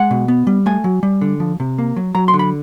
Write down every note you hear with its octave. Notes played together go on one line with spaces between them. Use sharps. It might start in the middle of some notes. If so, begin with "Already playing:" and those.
Already playing: G#3 F#5
B2
B3
G3
A3 G#5
F#3
G3
D3
F3
C3
A#3
F#3
F#3 A#5
C6
D3
B5